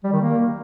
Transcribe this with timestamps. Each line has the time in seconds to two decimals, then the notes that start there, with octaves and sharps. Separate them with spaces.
0.04 G3
0.13 D#3
0.21 A#3